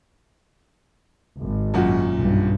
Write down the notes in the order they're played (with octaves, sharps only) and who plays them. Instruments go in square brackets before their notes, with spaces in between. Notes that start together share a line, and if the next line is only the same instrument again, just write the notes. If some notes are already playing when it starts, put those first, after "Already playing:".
[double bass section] G#1
[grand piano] F#2 A#2 F#4
[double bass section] B1 G2